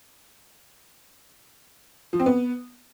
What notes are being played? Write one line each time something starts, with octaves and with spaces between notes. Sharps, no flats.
F3
C4
B3